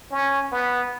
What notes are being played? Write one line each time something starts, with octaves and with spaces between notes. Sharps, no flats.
C#4
B3